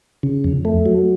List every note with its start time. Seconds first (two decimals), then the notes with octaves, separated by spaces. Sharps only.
0.23 C#3
0.44 F2
0.65 A3
0.86 F#3